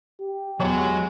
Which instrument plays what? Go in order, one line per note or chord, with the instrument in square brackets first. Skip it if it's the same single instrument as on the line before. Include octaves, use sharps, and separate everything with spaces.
[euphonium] G4
[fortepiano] E2 C#5 C#6 [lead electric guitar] F#3 [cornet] G#3